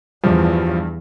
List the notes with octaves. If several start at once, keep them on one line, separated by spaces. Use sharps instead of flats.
E2 G2 F3